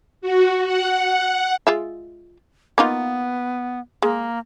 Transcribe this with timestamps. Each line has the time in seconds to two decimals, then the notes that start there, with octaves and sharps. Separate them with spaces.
0.21 F#4
0.65 F#5
1.67 G#3 F4 E5
2.78 A#3 B3 D#4 F4
4.02 G#3 A#3